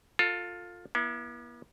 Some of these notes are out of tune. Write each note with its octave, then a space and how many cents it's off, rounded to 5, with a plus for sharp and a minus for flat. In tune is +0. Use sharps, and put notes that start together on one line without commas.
F4 +15 A4 +30
B3 -45 E4 +15